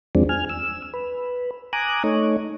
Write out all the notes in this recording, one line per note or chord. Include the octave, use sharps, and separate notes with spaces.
E2 F3 G#3 C4 D4
G#5 F6
E6
B4
G#5 A#5 D6 D#6 F#6
A3 D#4 C#5